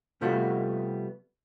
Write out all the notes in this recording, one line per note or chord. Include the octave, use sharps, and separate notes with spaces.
C3 F3 G3 A3 B3 F#4